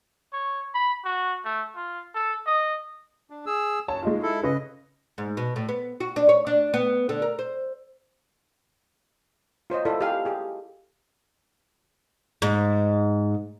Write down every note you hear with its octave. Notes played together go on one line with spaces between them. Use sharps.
C#5
B5
F#4
A3
F4
A4
D#5
D4
G#4 E6
F#2 C#5 A5
G#3 D#4 F4
E4 A4
C#3 C#4 B4 D#5
G#2
B2
A2
B3
F#4
D4
C#5
D4
B3
D3
A#4
C5
F4 C5 C#5 D#5
E4 F4 A4 C5 D5
G4 F5 G#5
G4 G#4
G#2